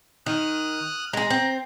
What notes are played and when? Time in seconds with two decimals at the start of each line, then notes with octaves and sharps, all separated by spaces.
0.26 D#3 D#6 F6 F#6
1.13 G#3 G#4 A#5
1.30 C4